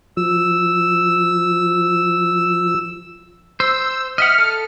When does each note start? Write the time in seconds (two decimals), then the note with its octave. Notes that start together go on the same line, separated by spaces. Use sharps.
0.17 F3 E6
3.60 C5 E6
4.18 D#5 E5 F#5 F6
4.38 A4